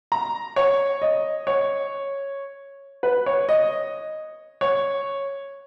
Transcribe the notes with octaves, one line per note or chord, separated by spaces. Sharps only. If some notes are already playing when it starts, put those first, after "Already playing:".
A#5
C#5
D#5
C#5
B4
C#5
D#5
C#5